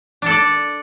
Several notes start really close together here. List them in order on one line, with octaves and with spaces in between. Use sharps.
D4 A4 D5